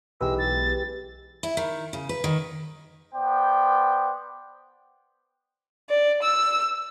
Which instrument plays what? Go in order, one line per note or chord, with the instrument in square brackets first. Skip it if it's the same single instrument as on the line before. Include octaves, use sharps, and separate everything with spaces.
[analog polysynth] B1 E3 G#3 [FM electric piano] G4 B4 [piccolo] E6
[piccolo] A6
[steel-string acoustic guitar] E4
D#3
C#3
B4
D#3
[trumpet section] B3 C5 D5 G5
[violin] D5
E6